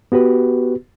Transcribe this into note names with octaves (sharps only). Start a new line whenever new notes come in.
B3 F#4 G4 B4